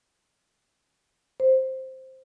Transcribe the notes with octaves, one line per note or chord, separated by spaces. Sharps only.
C5